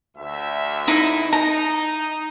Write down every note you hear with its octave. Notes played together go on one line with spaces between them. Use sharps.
D2 E5
D#4 E4
D#4 A#5